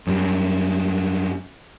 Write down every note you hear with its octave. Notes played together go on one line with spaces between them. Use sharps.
F#2 G3